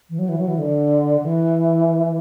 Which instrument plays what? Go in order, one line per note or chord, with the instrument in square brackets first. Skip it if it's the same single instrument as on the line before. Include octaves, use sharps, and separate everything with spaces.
[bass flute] E3
F#3
E3
F#3
E3
D3
E3